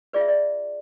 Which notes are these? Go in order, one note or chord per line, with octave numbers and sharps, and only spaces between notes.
F4 G#4 B4 D5
E5
D5